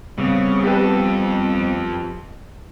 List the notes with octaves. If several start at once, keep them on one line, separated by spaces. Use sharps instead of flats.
C#3 G3 B3 C4
F2 G4 A4 B4